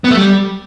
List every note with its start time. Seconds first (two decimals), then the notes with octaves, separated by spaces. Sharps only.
0.04 B3
0.11 A3
0.17 G3